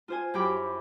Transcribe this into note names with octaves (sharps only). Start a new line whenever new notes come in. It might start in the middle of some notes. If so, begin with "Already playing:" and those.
F4 C5 G#5
F#2 E4 G4 G5 B5 D6